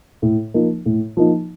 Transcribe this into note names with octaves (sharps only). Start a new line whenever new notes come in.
A2
F3 A#3 D#4
A2
F3 A#3 D#4